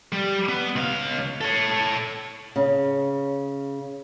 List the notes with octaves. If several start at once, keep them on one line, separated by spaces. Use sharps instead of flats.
G3
B3
C#2 F5
A4 C#5
C#3